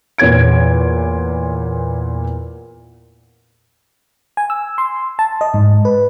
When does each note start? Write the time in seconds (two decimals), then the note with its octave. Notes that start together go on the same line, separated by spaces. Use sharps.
0.18 E2 A#2 C#5 G#6 D7
4.37 G#5
4.50 E6
4.78 C6
5.19 A5
5.41 D#5
5.54 G#2
5.85 B4